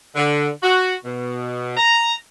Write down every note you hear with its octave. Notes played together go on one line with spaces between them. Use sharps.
D3
F#4
B2
A#5